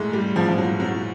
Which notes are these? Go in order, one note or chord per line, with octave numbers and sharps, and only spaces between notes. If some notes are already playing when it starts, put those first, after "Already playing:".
Already playing: G#2 E3 G#3 A3
G3
G#2 E3 F3
F3
F#3
F#3